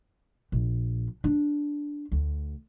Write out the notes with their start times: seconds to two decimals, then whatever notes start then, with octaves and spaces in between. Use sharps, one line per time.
0.52 A#1
1.24 D4
2.12 D2